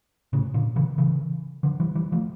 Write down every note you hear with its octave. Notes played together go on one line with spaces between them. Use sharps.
A2 C#3
A#2 D3
C#3 E3
C#3 E3
D3 F3
E3 G3
E3 G3
F3 A3